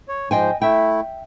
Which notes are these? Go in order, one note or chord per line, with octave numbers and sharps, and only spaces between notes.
C#5
G#2 F3 C5 D#5 G5 G#5
A3 E4 E5 G5